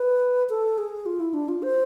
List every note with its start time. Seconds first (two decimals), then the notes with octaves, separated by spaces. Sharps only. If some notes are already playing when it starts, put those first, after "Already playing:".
Already playing: B4
0.50 A4
0.78 G#4
1.06 F4
1.20 E4
1.34 D4
1.48 F4
1.63 C5